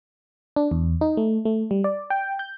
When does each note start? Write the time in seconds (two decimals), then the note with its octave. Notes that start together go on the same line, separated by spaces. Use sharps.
0.56 D4
0.71 E2
1.01 D#4
1.17 A3
1.45 A3
1.71 G3
1.84 D5
2.10 G5
2.39 G6